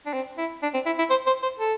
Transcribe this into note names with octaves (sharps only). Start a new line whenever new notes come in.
D4
C4
E4
D4
C4
E4
E4
C5
C5
C5
A4